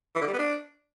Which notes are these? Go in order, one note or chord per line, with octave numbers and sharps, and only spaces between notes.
E3
D3
G3
B3
D4